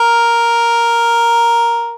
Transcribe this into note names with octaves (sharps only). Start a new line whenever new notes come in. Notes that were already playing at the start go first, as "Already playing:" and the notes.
Already playing: A#4